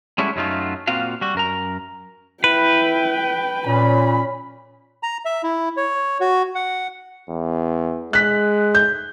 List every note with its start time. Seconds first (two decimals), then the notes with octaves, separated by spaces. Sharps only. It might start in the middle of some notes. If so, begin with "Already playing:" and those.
0.18 G3 G#3 C#4 E4 F#4 A4
0.36 F#2 F#3 A3 D#4 F4
0.87 A#2 C4 F4 F#4 F5
1.21 G3 F#4
1.35 F#2 A#4 A#5
2.44 E4 B4 G5
3.67 A#2 C#4 B5
5.03 A#5
5.25 E5
5.43 E4
5.77 C#5
6.21 F#4
6.55 F#5
7.30 E2
8.13 G#3 F#6 B6
8.75 G6